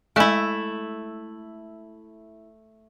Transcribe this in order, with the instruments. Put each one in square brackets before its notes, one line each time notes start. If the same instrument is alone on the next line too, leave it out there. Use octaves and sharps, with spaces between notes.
[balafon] G#3 D#5 G#5 [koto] A3 E4